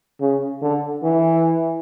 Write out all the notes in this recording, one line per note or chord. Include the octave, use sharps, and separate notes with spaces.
C#3
D3
E3